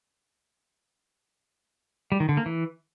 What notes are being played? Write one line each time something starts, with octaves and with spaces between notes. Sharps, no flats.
G3
D#3
D3
A#3
E3